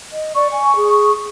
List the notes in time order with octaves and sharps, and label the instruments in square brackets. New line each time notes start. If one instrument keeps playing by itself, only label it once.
[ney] D#5
[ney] D5 [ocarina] C#6
[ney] G#5
G#4